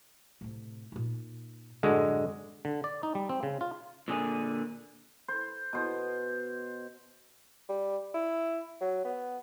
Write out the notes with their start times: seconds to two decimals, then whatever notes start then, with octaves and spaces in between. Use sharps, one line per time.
0.41 A2 C3
0.92 A#2 D#4
1.83 F#2 A2 D3 G#3 F#4
2.65 D3
2.84 D5
3.03 D#4
3.15 G3
3.29 C4
3.43 C#3
3.61 F4
4.08 A#2 D3 G#4
5.28 C5
5.73 B2 C5
7.69 G3
8.14 E4
8.81 F#3
9.05 B3